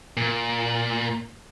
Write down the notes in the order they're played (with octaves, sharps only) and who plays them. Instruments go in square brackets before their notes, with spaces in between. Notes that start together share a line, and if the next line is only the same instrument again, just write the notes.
[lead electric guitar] A#2